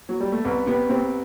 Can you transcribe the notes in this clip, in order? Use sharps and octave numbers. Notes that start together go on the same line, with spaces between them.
F#3
G3
A3
C2 B3
C3 B3
C3 C4